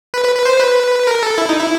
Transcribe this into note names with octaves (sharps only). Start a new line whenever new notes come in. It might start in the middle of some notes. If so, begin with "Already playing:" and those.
B4
B4
B4
C5
B4
A#4
A4
E4
D#4
E4